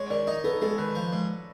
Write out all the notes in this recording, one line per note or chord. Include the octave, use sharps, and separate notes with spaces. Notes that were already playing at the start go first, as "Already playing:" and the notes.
Already playing: G#3 C#5
D#3 D5
D#4 D#5
B3 A4
G#3 A4
D#3 B4
F3
G#2